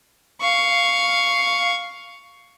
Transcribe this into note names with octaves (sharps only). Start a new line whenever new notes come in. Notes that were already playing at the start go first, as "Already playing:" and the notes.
F5 C#6